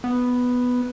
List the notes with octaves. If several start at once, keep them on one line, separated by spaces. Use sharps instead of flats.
B3